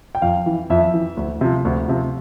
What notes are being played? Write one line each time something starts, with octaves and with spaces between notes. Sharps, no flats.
G5
F2 F5
E3
F2 E5
E3
D2
C3 F3
D2
C3 F3